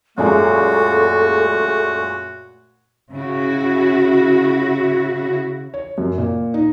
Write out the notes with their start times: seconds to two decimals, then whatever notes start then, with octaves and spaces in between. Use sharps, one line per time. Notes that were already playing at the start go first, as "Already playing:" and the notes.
0.18 F#2 A#2 G#3 A3 F#4 A4
3.13 C#3 E4 F#4
5.74 C#5
5.98 F#2
6.18 A#2
6.54 D#4